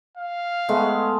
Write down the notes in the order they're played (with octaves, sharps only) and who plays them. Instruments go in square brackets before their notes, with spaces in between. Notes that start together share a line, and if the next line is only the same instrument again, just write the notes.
[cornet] F5
[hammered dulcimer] G#3 A3 B3